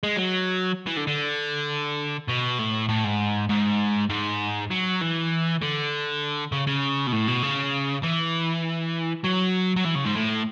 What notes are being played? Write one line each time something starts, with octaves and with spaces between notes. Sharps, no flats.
G#3
F#3
E3
D3
D3
B2
A2
A2
G#2
G#2
G#2
F#3
E3
D3
C#3
C#3
B2
A2
B2
C#3
E3
F#3
F#3
E3
C#3
G#2
A2